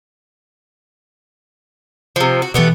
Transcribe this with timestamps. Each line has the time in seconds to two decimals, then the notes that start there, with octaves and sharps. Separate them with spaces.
2.16 C3 F3
2.42 F#4
2.54 B2 E3 A3 B3 G4